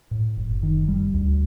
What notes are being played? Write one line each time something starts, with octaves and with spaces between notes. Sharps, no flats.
A2
F#1
D#3
G3
D2